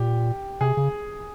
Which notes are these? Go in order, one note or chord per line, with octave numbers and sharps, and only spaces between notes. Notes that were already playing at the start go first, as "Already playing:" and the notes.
Already playing: A#2 G4
C3 G#4
C#3